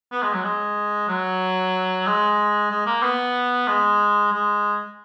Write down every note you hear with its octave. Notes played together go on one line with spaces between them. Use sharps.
B3
G#3
F#3
G#3
F#3
G#3
G#3
A#3
B3
G#3
G#3